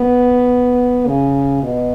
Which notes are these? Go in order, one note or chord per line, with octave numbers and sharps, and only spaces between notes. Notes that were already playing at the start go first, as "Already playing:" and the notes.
Already playing: B3
C#3
B2